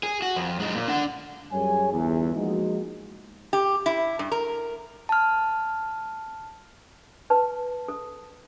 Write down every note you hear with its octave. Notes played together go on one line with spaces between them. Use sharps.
G#4
F#4
F2
F#2 G#3
A#2
D4 F#5
F#2 G3 G#4 C#5 G#5
G1 E2
F3 G#3 A#3 D#4 F#4
G4
E4
G2
A#4
A5 F6
B4 A5
A4